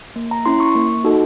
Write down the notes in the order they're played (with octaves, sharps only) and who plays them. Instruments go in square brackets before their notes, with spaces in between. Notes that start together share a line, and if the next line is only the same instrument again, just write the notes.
[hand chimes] A#3
A#5
C#4 E4 C6
C#6
A#3
D#4 F#4 A4